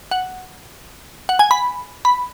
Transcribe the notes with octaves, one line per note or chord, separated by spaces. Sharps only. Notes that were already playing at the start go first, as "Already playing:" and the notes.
F#5
F#5
G#5
B5
B5